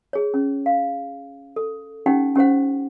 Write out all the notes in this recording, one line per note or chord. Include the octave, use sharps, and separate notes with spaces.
G#4 C#5
C#4
F5
A4
C#4 D#4 G4 F#5 G5
C#4 G4 C5 F#5